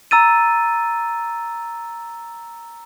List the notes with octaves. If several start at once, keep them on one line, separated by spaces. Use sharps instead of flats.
A#5 E6 A6 D#7